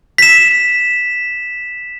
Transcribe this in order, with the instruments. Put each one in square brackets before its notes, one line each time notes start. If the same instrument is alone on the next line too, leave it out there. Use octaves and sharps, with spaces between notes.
[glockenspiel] B6 E7